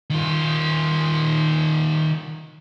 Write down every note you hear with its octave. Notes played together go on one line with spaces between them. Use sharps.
D#3 F4